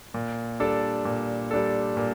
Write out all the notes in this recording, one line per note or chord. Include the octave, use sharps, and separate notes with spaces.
A#2
G3 D4 A4
A#2
G3 D4 A4
A#2